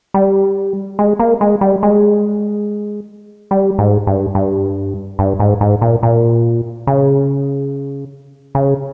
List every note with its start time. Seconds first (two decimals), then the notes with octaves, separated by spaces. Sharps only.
0.14 G3
0.99 G#3
1.19 A#3
1.41 G#3
1.61 G3
1.83 G#3
3.51 G3
3.78 G#2
4.07 G2
4.35 G2
5.19 G2
5.40 G#2
5.61 G#2
5.81 A#2
6.03 A#2
6.87 C#3
8.55 C#3